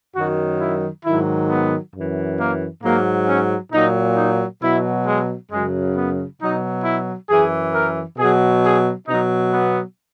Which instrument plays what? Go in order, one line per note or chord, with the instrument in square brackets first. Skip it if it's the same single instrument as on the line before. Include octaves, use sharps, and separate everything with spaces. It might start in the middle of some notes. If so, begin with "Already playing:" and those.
[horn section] F#2 D#3 F#3 F#4
E4
G#2 D#3 F#3 E4
B3
F#2 E3
A#3
G#2 F#3 A#3
C#4
A#2 F#3 D#4
D#4
B2 F#3 E4
G#3
F#2 C#3 F#3 G#3
B3
B2 F#3 D#4
E4
F#2 E3 G#4
A#4
B2 F#3 G#4
G#4
B2 F#3 D#4
B3